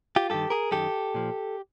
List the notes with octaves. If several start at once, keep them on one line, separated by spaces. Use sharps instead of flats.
F4 G4
G2 D#3 G4 A4
G#4 A#4
F#2 D#3 G4 A4
A#2 F3